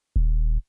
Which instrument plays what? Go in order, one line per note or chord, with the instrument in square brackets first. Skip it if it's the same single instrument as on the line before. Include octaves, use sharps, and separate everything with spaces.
[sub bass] D#1